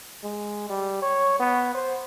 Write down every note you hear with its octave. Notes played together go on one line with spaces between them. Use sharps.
G#3
G3
C#5
B3
C5